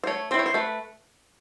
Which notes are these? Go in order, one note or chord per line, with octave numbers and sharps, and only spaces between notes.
C5
A3 C#5
C4 E4 C5
C#5
C5
A3 B4